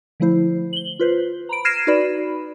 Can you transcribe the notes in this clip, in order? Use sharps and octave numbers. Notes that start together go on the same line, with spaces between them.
D3 F3 A3 E4 C5
F#7 G7
F4 B4 C5
A#5 B5 D7
F6 G#6 A#6 C7 D#7 E7
D#4 F#4 B4 D5 B5